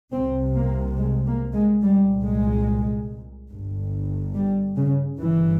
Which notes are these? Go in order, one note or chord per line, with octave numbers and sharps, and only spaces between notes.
C2 C3 C4
A#3
G#3
A#3
G#3
C2 A#2 G3
G#3
G1 G2
G3
C#3
G1 G2 E3